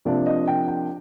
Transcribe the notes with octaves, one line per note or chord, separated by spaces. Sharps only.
C3 F3 A#3 D4 D5
D#5
G5
G5